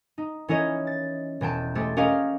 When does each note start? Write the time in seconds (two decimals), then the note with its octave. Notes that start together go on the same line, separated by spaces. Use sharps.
0.18 D#4
0.48 E3 C#4 E4 A#4 C#5 D#5
0.87 A6
1.41 E1 E3 G5 A5
1.75 G#3 A3 G4 C5 E6 A6
1.97 C#4 G4 A#4 D#5 F5 C#6